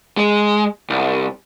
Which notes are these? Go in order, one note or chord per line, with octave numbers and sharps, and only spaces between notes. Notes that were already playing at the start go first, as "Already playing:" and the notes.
G#3
C2